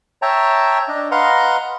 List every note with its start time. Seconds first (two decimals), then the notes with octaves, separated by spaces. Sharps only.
0.22 C#5 E5 G5 A5 A#5
0.88 D4 D#5
1.11 B4 D#5 F5 F#5 A#5 C6